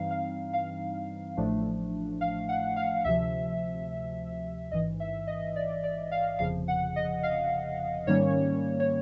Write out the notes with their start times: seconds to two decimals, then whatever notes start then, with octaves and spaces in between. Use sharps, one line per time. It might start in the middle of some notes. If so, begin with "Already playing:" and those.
Already playing: G2 E3 G3 C4 D#4 F5
0.11 F5
0.53 F5
1.37 A1 A2 F3 A3 D4
2.21 F5
2.49 F#5
2.76 F5
3.04 D2 C3 F3 E5
4.71 A1 G#2 E3 D#5
5.00 E5
5.27 D#5
5.56 D5
5.84 D5
6.11 F5
6.39 G1 F2 C#3 F3 F5
6.68 F#5
6.96 D#5
7.23 F5
8.07 G#2 D#3 G3 A#3 C#4 C#5
8.80 C#5